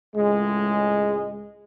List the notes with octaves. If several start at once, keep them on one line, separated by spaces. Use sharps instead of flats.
C#2 A2 G#3